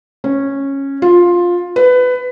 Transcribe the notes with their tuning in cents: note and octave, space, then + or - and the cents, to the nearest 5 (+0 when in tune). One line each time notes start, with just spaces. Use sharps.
C#4 -10
F4 +10
B4 +20